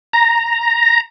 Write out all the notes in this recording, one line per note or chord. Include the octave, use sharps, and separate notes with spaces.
A#5